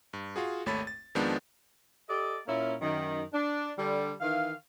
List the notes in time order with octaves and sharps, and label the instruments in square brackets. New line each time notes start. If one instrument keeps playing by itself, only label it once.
[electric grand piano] G2
F4 F#4 G#4
G#1 D#2 A3 C#5 B5 A6
A6
F2 D#3 F3 G#3 B3 D4
[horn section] G4 A4 D5 D#5
A#2 A#3 C#4 E4
F#2 D#3
D4
D3 G3
D#3 E3 F5